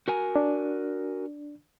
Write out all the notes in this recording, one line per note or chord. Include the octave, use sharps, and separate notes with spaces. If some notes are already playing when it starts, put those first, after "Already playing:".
F#4 A#4 G#5
D4